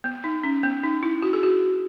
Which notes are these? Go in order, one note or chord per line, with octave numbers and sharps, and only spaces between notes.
B3
D#4
C#4
B3
D#4
E4
F#4
G#4
F#4